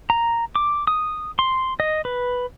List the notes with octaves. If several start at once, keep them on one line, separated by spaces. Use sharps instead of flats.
A#5
D6
D#6
C6
D#5
B4